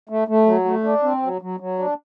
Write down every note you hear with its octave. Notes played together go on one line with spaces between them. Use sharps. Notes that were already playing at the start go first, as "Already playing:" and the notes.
A3
A3
F#3
A3
D4
C4
F#3
F#3
F#3
D4